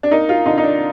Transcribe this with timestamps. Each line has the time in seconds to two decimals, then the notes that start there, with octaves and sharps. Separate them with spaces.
0.03 D4
0.11 A#3 D#4
0.29 F4
0.46 D3 D#4
0.58 D#4
0.63 D4